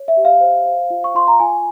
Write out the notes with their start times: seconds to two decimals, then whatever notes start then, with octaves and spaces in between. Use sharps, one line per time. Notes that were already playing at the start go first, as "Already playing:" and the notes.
Already playing: C#5
0.08 E5
0.17 G4
0.25 F5
0.41 C5
0.66 C5
0.90 F4
1.04 C#6
1.15 F4 C6
1.28 A#5
1.40 F4 G#5